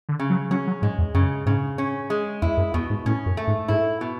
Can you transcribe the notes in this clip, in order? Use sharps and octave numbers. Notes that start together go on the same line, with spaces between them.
D3
C#3
F#3
F#3 C#4
F#3
G#2 G#3
E2
F#2 C#3
G#2 C#3
C#4
G#3
E2 E4
F#2
E2 B2
G#2
A2 C#4
F#2
A3
G#2
G#2 E4
B2